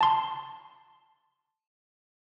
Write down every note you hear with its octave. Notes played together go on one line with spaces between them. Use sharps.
A5 C6